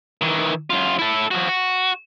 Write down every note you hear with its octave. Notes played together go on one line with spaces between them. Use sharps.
D#3 E3
F#2 F4
E4 A4
F3 F#4
F#4